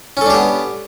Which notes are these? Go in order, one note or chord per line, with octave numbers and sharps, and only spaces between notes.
B3 C#4 D4 G4 A4